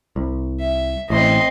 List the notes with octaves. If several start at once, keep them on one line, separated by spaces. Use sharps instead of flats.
C2
E5
A1 C4 D#5 C6